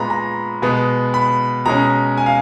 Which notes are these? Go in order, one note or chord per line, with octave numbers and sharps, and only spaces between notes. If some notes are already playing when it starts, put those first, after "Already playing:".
Already playing: A#2 G#3 B3 A#5 B5
A#5
B2 G#3 B3
B5
B2 G#3 C#4 A#5
G#5
F5